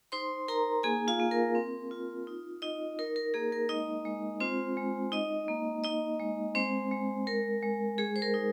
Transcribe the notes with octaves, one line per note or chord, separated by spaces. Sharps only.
D#4 C5 C6
D#4 A#4 A#5
A#3 G#4 G#5
F4 F5
A#3
A#4
C4
F4
D#4
D#4 D#5
D#4 A#4
A#4
A#3 G#4
A#4
G#3 D#4 D#5
G#3
C4 F4 C5
G#3
D#4 D#5
A#3
D#4 D#5
G#3
G#3 C4 C5
G#3
G#3 A#4
G#3
G#3 G#4
C5
A#4
D#4